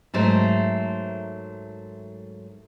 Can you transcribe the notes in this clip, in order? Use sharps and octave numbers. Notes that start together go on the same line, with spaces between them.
G#2 F#3 A3 A#4 C5